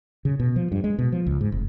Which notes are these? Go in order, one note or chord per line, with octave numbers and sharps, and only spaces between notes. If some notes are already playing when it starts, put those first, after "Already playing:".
C#3
B2
F3
G2
G#3
B2
F3
C#2
G#2
F1